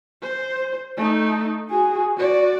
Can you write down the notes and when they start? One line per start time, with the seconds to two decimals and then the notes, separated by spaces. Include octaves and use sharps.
0.22 C5
0.97 A3 D#4
1.70 F#4 G#4
2.17 F#4 D5